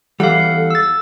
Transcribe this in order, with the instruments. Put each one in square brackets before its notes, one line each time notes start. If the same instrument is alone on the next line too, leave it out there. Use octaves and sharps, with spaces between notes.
[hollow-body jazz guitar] E2 E3 G3 [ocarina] A4 [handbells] F5 F#5
[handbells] E6 A6